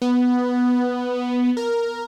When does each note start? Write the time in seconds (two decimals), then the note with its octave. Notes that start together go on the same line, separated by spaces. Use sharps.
0.02 B3
1.57 A#4